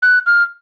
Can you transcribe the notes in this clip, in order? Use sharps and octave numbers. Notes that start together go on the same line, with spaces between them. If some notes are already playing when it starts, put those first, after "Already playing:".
F#6
F6